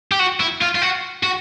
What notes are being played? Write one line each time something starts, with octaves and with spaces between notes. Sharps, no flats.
G4
F#4
E4
F4
F4
F#4
F#4